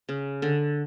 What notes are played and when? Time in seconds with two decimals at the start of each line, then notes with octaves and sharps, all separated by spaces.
0.09 C#3
0.42 D3